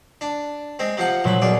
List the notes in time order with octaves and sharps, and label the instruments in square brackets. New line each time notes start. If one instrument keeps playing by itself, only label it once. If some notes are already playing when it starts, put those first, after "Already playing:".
[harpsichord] D4
G#3 C4
C3 F3 F#5
[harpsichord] C2 B5 [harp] A#2 F#3
[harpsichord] B1 G#4 [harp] D5